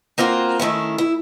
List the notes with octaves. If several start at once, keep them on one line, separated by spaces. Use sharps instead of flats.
A#3 C4 F4 F#4 A#4
D#3 A3 C#4 E4
E4